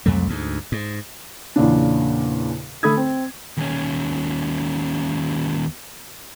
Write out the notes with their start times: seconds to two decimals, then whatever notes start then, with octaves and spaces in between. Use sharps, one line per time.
0.06 C2 F2 F#3 A3
0.28 D2 G#2
0.72 G#2
1.56 E2 A#2 C#3 D4
2.83 D3 A3 A4 B5 D#6 G#6
2.97 C4
3.57 D#2 C#4